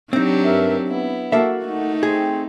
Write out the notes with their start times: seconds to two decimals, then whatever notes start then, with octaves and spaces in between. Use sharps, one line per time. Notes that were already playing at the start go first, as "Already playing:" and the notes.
0.13 F#3 C4 D4 D#4 G4
0.45 G2 A#4 E5
0.89 B3 E4
1.32 A#3 F#4 A4 E5
1.64 A3 D#4
2.03 C4 G#4